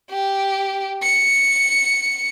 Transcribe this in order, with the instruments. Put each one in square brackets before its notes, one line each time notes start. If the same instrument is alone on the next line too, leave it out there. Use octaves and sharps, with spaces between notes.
[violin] G4
C#7